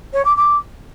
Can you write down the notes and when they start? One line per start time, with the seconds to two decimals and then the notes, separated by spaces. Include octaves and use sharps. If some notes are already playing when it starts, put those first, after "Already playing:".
0.13 C#5
0.25 D6
0.37 D6